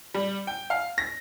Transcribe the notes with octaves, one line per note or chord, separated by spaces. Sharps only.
G3
G5
F5
A#6